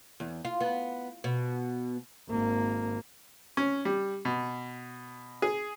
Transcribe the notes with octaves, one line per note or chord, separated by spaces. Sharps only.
E2
F4
B3
B2
G#1 A#3
C#4
G3
B2
G#4